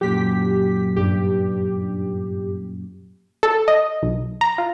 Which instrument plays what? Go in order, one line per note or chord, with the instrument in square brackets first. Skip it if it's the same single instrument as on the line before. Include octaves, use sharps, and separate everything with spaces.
[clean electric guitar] F#2 A#2 F#3 [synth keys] G4 B6
[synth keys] G2 G4
[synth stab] A4
D#5
B1
A#5
F4